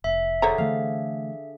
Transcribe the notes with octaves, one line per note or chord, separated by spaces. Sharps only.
F1 E5
D3 G#4 A4 C5 C#5 A#5
D3 E3 A3 F5